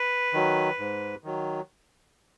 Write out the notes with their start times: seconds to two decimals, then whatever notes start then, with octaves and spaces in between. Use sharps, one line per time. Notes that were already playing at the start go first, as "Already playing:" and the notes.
Already playing: B4
0.34 D#3 F#3
0.79 G#2
1.24 D#3 F#3